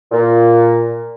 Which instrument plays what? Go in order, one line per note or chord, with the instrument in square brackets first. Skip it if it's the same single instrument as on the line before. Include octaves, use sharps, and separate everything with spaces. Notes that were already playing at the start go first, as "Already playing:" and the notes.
[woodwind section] A#2